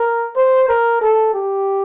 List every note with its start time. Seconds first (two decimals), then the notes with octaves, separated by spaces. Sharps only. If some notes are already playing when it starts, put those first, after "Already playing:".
Already playing: A#4
0.36 C5
0.69 A#4
1.02 A4
1.34 G4